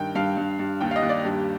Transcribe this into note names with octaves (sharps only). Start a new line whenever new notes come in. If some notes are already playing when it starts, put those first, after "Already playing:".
Already playing: G2 D#3 G5
G2 F5
G2
G2
D#2 G5
F5
D#5
D#2
D5
G2 G4